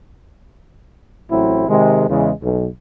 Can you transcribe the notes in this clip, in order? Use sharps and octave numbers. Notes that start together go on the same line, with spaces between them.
A1 A2 F#3 C4 E4
C3 D#3 G#3
E2 C#3 E3 G#3
B1